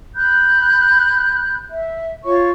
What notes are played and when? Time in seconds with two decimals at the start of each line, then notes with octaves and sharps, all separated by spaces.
0.16 B5 F#6 G6
1.70 E5
2.23 F4 C#5 C#6